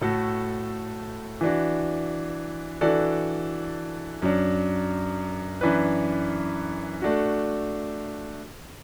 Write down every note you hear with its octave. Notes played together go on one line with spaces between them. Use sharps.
A2 A3 F#4 A4
E3 D4 F#4
E3 D4 F#4 A4 D5
F#2 F#3 D4
F#2 E3 D4 B4
A3 D4 F#4